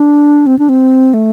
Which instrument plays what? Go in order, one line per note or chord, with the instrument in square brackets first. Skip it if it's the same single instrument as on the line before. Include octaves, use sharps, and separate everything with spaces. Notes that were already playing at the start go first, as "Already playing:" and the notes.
Already playing: [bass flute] D4
C4
D4
C4
A3